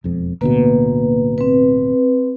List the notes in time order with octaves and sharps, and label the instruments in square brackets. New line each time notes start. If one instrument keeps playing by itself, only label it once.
[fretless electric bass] E1 F2
[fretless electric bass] D1 D2 B2 [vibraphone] A#3 B4
[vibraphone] C4 B4